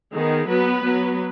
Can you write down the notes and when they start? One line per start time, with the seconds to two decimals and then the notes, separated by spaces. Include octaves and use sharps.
0.14 D#3 B3 G#4
0.48 F#3 B3 B4
0.82 F#3 B3